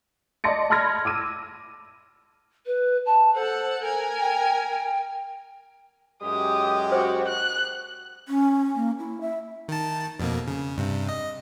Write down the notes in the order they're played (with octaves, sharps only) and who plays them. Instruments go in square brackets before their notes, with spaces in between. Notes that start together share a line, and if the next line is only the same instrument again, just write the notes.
[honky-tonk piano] D5 D#5 A5 C6 A#6 C#7
A5 B5 C6 F6 G#6 A#6
D6 E6 D#7
[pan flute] B4
A5
[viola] A4 F#5 [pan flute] C5
[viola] A#4 G#5
[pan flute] G5
G5
[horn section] F#2 G#3 G4 [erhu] D#6
[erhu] F#4 [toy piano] C5 D#6
[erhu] F#6
[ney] C#4
A#3
E4
E5
[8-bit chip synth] D#3 A5
F2 B2 A#3
C#3
G2 C3
D#5